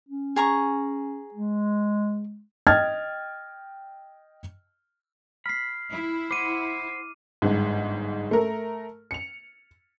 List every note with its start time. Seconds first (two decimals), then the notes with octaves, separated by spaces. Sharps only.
0.09 C#4
0.36 G#4 A#5 C#6
1.34 G#3
2.67 D#5 G5 F6 G#6 A6
5.46 B5 F6 C7
5.92 E4
6.31 C5 F#5 D6 D#7
7.42 G1 G#2
8.31 A3 A#4
9.11 C#7 F7